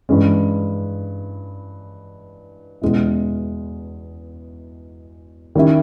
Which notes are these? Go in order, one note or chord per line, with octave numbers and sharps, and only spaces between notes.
G2 E3 G#3 C#4
E2 B2 G#3 C#4 E4
D#3 G3 C#4 E4